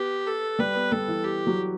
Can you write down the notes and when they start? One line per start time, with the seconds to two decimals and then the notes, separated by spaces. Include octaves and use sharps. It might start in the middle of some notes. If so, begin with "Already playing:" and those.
Already playing: B3 G4
0.27 A4
0.59 G3 B4
0.75 B3
0.92 G3 A4
1.08 E3
1.24 G4
1.47 F#3